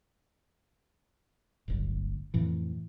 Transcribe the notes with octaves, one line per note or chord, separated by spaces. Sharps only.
D1 G1 D2
F2 A2 E3